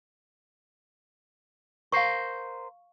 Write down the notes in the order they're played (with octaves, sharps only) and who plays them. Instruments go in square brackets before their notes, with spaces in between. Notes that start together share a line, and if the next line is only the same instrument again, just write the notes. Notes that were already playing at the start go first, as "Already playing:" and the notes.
[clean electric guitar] A#4 C5 [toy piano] F5 C#6